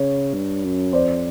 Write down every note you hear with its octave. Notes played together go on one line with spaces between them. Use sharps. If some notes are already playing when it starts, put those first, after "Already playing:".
Already playing: C#3 C#5
G2
F#2
F2 C5 D5